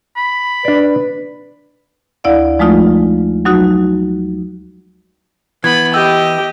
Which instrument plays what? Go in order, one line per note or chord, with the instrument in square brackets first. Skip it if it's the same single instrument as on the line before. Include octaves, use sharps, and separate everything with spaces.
[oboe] B5
[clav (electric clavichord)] D4 D5 [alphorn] B4
[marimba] D2 E4 D5 F5
F3 G#3 A3 D#4 F4
F#3 D#4 F#4
[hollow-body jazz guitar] E3 [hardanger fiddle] B3 B5 [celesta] G#6
[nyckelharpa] G4 [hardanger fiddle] D#5 [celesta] E6 G6